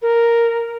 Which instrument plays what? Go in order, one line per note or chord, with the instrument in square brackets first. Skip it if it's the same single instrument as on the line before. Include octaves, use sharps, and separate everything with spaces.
[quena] A#4